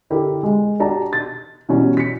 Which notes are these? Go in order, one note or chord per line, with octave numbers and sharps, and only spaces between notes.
D3 E4 G4 A#4
G#3
D4 F#4 G4 A5 A#5
A6
B2 E3 F#3 G3 C#4
B6 C#7